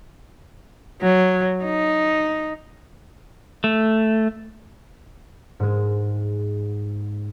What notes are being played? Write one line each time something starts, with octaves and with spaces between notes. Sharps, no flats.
F#3
D#4
A3
G#2 G#3